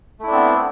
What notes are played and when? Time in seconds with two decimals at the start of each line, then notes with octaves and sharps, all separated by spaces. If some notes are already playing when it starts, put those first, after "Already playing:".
0.20 A3
0.23 E4
0.27 D4
0.31 C4
0.34 B3